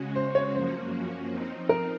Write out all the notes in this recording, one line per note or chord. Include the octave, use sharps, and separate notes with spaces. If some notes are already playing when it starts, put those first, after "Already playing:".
Already playing: C#3 G#3 C#4 F#4
C5
C#5
F#2 F3 A#3 C#4 F#4 C5
F3 C4 D#4
A#4